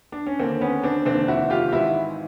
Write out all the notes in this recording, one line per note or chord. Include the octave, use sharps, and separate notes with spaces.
D4
C#4
D#2 D3 A#3 C4
B3 C#4
C4 D4
F1 D#2 D3 C4 D4
E4 F#4
F4 G4
G#1 G#2 E3 E4 F#4